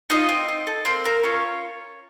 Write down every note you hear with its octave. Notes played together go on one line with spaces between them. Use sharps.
D#4 F4 D#5
C4
C4
A4
A#3 C4 C5
A#3 A#4
C#4 F4 C#5